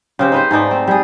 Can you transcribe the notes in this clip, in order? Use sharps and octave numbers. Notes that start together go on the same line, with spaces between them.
C#3 C4 G4
D#4 B4 C5
G#2 A3 D#4 D5
C4
G3 G#4